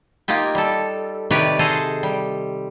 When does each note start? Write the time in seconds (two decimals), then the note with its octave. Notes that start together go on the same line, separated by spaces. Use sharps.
0.28 A#3 D#4 F4 G4
0.55 G3 A4
1.30 C3 D#3 G4 B4 C#5 D5
1.59 G#4 A4 C5 D#5 F5
2.03 G3